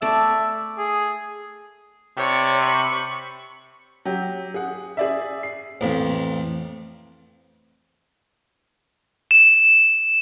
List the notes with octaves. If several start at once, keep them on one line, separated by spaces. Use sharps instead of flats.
A3 D5 E5 A5
G#4
C3 C#5 D5
B5 C#6
F#3 G4
G#4 F#5
G#4 D5 E5
C7
A1 F2
E7